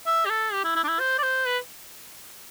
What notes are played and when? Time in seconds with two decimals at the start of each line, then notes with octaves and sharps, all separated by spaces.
0.06 E5
0.25 G4
0.30 A4
0.53 G4
0.64 E4
0.76 E4
0.84 D4
0.88 E4
0.99 C5
1.18 D5
1.23 C5
1.46 B4